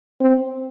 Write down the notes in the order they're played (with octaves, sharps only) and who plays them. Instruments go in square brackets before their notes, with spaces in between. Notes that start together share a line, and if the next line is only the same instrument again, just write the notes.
[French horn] C4